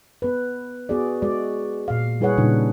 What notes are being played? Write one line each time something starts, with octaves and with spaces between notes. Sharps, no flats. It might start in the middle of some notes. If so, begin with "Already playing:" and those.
B3 B4
B3 F#4 G#4 D5
G#3 F#4 D5
A#2 F5
G3 E4 G#4 B4 C#5 F#5
A#2 C#3 G3 D4 D#4